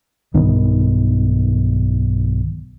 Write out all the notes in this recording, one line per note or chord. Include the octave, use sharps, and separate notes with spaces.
B1 G2 D#3 B3